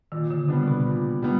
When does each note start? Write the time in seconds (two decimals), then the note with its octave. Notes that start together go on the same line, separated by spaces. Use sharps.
0.12 A#2 D#3
0.31 D3
0.48 C#3 G3 B3 D4
0.68 B2
0.86 A#2
1.22 G3 B3 D4